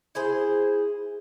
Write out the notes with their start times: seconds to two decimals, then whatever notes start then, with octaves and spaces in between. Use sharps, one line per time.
0.15 E4 G#4 C5